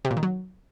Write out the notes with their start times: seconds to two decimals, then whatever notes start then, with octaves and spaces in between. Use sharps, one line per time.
0.05 C3
0.11 A#2
0.17 D#3
0.23 F#3